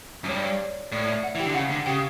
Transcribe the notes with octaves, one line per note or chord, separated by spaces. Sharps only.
F#2
G2 C#5
D5
C#5
A2 D5
E5
F#5
E3
G4 G5
D3
C#3 F#5
D3
C#3 G4 G5